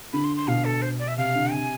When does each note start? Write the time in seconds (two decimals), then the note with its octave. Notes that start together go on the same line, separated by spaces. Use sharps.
0.13 D3 B5
0.24 C6
0.37 C6
0.47 B2 F5
0.65 A4
0.82 C5
0.99 D5
1.08 E5
1.17 C3 F5
1.35 D3
1.52 C3 G#5